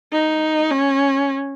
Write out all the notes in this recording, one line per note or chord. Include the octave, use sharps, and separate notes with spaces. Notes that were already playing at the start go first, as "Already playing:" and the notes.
D#4
C#4